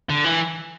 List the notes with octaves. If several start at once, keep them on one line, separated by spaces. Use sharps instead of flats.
D3
E3